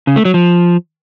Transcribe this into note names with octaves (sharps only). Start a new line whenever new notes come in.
C#3
A3
F#3
F3